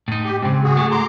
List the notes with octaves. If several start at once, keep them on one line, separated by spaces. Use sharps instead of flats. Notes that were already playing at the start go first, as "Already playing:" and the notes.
A2 D#4
G4
G#2 C#3 C4
F#4 G#4
A3
A#5 C6 D6